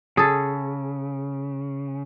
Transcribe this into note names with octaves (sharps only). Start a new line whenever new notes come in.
C#3 G#4 A4